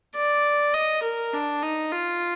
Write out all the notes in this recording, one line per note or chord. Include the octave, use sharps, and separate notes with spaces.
D5
D#5
A#4
D4
D#4
F4